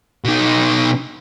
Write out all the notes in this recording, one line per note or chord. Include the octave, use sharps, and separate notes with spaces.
B2 D#4